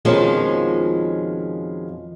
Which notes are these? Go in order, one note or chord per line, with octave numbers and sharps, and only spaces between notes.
F2 B2 D#3 F3 G#3 C#4